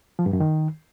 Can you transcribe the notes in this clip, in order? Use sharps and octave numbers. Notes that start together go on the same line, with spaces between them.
F3
G2
F#2
D#3